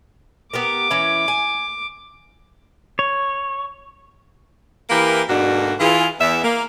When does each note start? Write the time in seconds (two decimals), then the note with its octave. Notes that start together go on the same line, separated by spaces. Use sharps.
0.53 B3 G4 A#4 D6
0.90 E3 C#4 E4
1.28 G#5
2.99 C#5
4.90 E3 A#3 E4 G4 A#4 B4
5.28 G#2 B2 D3 A#3 D4 F#4
5.80 E3 F4 G#4
6.20 E2 E5
6.44 A#3